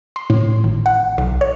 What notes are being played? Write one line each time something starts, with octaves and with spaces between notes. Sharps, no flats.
C6
A2
G#1
F#5
B1
C#5